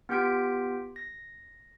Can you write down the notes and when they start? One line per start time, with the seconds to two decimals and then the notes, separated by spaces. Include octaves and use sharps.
0.09 B3 F4 G4 G6 B6 D7
0.96 A#6